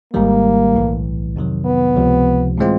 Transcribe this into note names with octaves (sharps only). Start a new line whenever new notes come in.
G#1 G#2 D#3 G3 A#3
B1 A2 E3
F2 C3 D#3 F#3
B3
C#2 C3 F3
A2 E3 G#3 C4 F4